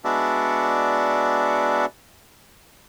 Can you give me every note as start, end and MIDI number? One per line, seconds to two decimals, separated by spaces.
0.04 1.86 56
0.04 1.86 59
0.04 1.86 62
0.04 1.86 66
0.04 1.86 74
0.04 1.86 76